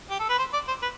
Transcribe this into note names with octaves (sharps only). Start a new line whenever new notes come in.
G4
A4
B4
C5
D5
C5
B4